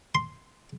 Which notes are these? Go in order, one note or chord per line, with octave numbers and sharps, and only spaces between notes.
C6